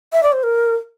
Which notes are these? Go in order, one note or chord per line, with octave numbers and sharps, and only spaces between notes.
E5
D5
C5
A#4